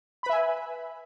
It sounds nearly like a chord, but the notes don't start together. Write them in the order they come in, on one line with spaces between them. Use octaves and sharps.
B5 B4 E5 G#5